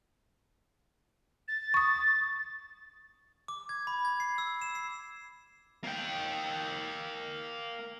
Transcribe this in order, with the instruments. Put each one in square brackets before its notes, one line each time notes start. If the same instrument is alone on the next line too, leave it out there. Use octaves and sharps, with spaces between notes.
[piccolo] A6
[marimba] C#6 D#6
[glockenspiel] D6
G#6
B5
G#6
C7
E6
E7
C7
[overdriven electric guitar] A#3 G5